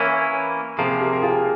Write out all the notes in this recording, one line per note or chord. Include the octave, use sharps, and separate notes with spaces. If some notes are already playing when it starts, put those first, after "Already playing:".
Already playing: E3 A#3 C#4 E4 A#4 C#5
C3 F3 A#3 G#4 C5
G4 A#4
A#4
F4 G#4